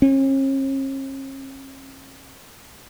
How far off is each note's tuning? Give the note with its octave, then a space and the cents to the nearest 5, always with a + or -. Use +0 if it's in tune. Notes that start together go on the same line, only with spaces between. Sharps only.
C#4 -45